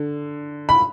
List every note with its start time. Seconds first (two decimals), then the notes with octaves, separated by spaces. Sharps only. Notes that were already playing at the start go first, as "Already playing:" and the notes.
Already playing: D3
0.69 B5